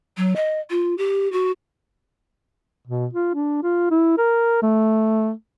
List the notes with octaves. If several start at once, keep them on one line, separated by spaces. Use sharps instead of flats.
F#3
D#5
F4
G4
F#4
B2
F4
D4
F4
E4
A#4
A3